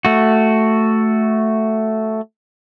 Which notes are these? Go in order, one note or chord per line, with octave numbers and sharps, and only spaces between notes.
A3 F#4